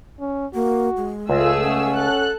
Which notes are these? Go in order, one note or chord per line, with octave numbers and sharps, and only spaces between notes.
C#4
A#3 F#4
G#3
C#2 A3 F4 G#4 E6
C#4 F#5
A4 F#6